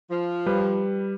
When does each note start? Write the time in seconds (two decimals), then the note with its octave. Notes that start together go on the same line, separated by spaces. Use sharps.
0.10 F3
0.46 G3 B4